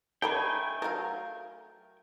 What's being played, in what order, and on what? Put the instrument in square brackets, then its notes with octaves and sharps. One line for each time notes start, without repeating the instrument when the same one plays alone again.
[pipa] G#3 A3 D4 [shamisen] A4 A#5 B5 [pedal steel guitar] G5 G#5
[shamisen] F#3 A3 [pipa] A#4 F5